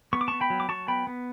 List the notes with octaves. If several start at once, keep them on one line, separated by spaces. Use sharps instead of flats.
B3 C#6
D6
B3 A5 C#6
G5 B5
F#3
D6
F#3 A5 C#6
B3 G5 B5
B3